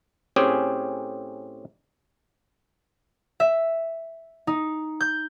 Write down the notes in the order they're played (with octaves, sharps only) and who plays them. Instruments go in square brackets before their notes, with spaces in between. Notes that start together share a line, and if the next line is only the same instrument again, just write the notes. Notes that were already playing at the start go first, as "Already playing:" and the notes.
[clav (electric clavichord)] A2 C4 C#4 G4 G#4
[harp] E5
D#4
G6